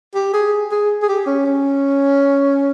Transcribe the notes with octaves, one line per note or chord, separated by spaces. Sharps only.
G4
G#4
G#4
G#4
G4
C#4
C#4